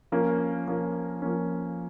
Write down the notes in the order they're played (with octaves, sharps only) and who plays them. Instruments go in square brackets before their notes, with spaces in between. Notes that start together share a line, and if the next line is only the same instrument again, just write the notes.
[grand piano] F3 A#3 C#4
F3 A#3 C#4
F3 A#3 C#4